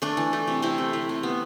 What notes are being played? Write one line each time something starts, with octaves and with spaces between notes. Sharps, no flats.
A3 D4
E3
A3
C3
C3 C4 E4
A3
A3
C3
B3